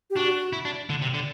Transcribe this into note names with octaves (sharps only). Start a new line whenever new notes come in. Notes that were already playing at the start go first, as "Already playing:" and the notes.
G4
D4 F#4
E4
D4
D3
C3
D3